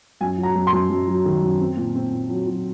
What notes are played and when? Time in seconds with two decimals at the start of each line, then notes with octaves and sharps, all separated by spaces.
0.21 F#2 G#5
0.38 F#3
0.43 A#5
0.55 F#2
0.67 C6
0.73 F#2
0.90 F#2
1.07 F#3
1.25 D#3
1.42 F#2
1.60 C4
1.77 A#2
1.95 C4
2.12 A#2
2.29 F#3
2.46 F#3